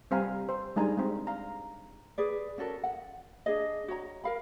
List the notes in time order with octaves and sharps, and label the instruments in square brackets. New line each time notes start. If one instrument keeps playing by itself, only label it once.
[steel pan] G3 C4 F5 G#5 A#5 B5
C5
G3 G#3 D4 D#4 G#5 A#5
G#3 C4
F5 A#5
[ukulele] G#4 B4 D5
C#4 F#4 A4 A#4
F#5
D4 G#4 D#5
F#4 C#5 A#5
A#4 F5 B5